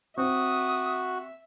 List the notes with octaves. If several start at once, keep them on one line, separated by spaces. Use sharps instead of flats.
C4 F#4 E5 D#6